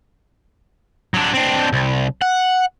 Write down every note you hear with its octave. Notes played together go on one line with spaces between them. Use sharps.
F#3 D4
C4 D4
C2
F#5